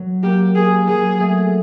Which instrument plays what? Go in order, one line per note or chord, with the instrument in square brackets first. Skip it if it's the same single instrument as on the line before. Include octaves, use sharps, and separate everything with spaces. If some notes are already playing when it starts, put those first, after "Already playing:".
Already playing: [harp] F#3
[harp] A#3 [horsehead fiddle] G4
[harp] A#3 [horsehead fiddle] G#4
[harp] F#3 [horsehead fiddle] G#4
[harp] A3